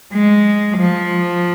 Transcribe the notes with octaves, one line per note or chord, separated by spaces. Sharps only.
G#3
F3